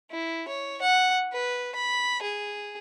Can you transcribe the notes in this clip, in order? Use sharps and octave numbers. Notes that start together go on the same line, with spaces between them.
E4
C#5
F#5
B4
B5
G#4